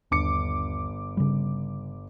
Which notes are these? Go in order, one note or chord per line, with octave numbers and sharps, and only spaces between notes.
G1 D#2 D4 D6 C#7
C#3 G3